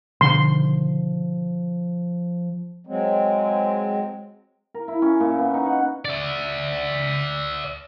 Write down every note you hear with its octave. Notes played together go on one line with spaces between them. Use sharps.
B2 D3 D#3 F3 C6
F#3 G#3 C4
A#4
E4
C#4
A#2
B3
D#4
F#5
D5 E5